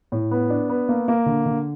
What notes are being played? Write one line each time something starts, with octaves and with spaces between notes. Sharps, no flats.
A2
B3
D4
B3
A#3
A#3
D3
D3